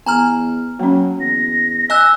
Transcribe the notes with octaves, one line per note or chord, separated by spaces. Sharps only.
E2 B3 G#5 A#5 F6
F#3 A#3 C#4
E2 A#6
D#5 G#5 E6 F#6